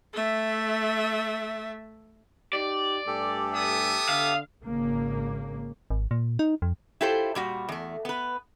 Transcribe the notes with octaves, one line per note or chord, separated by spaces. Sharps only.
A3 E5
D#4 G4 D5
G2 A3 G4 A4 G#5
B3 E5 D#6
D3 F5
G#1 C#3 A#3
G#1
A#2
D#4
F2
E4 F4 G4 A4 C5
A#2 G3 F#4
E2 A3
B3 B4